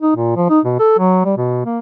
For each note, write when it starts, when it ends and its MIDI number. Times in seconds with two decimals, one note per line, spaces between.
0.01 0.16 63
0.16 0.32 46
0.36 0.47 53
0.50 0.60 63
0.65 0.75 47
0.79 0.94 69
0.98 1.23 54
1.25 1.34 55
1.37 1.63 47
1.65 1.79 58